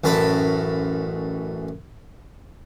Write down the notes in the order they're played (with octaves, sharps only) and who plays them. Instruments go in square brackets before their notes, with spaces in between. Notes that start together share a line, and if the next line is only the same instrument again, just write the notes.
[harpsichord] A1 F#2 A#4 A5 B5